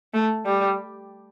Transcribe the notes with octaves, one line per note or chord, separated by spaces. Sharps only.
A3
G3